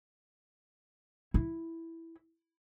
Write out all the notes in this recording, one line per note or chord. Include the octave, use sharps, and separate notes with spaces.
E4